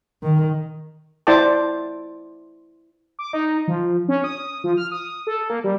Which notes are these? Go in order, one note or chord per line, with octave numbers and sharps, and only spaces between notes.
D#3
E4 C5 D5 G5 A5 D6
D6
D#4
F3
C#4
D#6
F3
F6
D#6
A4
A#3
G3